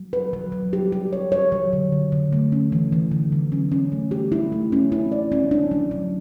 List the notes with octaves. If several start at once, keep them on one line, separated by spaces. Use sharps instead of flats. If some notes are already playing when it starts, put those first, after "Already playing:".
Already playing: F#3
B4
F#3
F#3
G4
G4
C#5
C#5
F#3
D3
D3
D3
A3
C#4
E3
E3
D3
F#3
C#4
C#4
A3
G4
E4
A3
C#4
E4
D5
C#4
D4
F#3
F#3